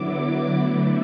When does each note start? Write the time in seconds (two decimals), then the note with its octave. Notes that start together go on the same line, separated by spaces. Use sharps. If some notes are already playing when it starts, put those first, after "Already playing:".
Already playing: D3 F#3 B3 E4 D6
0.49 D3 F#3 A3 E4